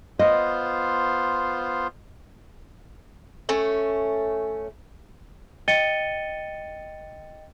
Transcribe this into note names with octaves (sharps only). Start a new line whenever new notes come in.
B3 F4 C5 D#5
A3 C#4
D#5 G5 A6 C#7 D#7 G7